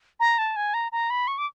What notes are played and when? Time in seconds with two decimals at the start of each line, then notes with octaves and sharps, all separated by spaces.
0.20 A#5
0.39 A5
0.56 G#5
0.74 A#5
0.92 A#5
1.10 B5
1.28 C#6
1.38 D6